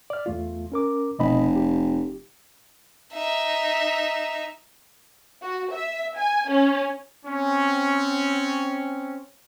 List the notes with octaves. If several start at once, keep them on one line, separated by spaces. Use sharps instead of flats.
D5 F6
E2 A3 F4
C#4 A#4 D6
F1 B2 D#5 B5
G4
D#4 E5
F#4
E5
G#5
C#4
C4 C#4